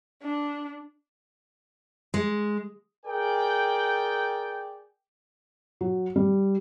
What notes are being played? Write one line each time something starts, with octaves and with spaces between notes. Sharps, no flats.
D4
G#3
G#4 A#4 D5 G5
F#3
G3